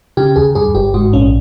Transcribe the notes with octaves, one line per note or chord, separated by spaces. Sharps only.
C#3 G4
D#2 G#4
G2 G#4
G1 G4
G#2 F#4
A#1 C#4